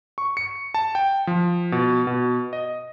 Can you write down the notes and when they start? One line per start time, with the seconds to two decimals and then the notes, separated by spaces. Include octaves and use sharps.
0.18 C#6
0.37 C#7
0.74 A5
0.95 G5
1.27 F3
1.72 B2
2.07 B2
2.53 D#5